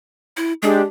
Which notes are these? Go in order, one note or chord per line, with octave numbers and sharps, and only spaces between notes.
E4
G#3 D4 G4 G#4